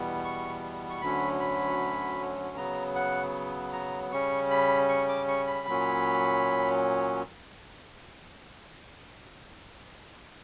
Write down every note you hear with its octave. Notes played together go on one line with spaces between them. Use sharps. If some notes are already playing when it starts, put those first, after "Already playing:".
Already playing: E2 B2 G3 B3
C#6
C#6
D2 D3 F#3 C#4 B5
B5
C#3 F#3 B3 A#5
F#5
A#5
C#3 G3 C#4 C#6
B5
C#6
D6
C#6
B5
A#2 F#3 C#4